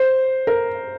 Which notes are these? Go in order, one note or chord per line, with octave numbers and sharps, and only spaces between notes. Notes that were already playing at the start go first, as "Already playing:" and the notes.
Already playing: C5
A#4